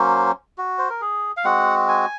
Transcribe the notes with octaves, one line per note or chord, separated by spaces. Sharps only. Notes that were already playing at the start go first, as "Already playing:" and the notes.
Already playing: F#3 A#3 C#4 C5
F#4
C5
A#4
G#4
F5
G#3 C4 F#4 F#5
G#5